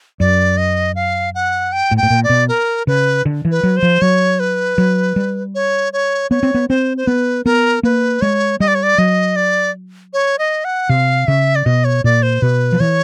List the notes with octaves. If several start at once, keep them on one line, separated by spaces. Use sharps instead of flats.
F#2 D5
D#5
F5
F#5
G5
A2
G5
A2
A#2
D5
B2
A#4
C#3 B4
D3
E3
B4
F#3
C5
F3
F#3 C#5
B4
F#3
G3
C#5
C#5
B3 C#5
C4
B3
C4 C5
C5
B3 B4
B3 A#4
A#3 B4
G#3 C#5
G3 D#5
D5
C#5
D5
F#3 D#5
D5
C#5
D#5
F#5
C3 F5
C#3 E5
D5
B2 D#5
C#5
A#2 D5
C5
B2 B4
F3
E3 C#5